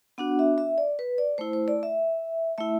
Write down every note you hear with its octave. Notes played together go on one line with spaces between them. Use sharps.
B3 D4 F#4 F#5
E5
E5
D5
B4
D5
A3 E4 C5
C5
D5
E5
A3 E4 E5